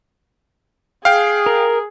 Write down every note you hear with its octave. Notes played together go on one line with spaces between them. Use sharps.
G#4 F5 G5
A#4